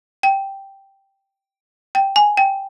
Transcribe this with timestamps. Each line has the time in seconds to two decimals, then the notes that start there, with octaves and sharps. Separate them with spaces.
0.23 G5
1.95 G5
2.16 G#5
2.37 G5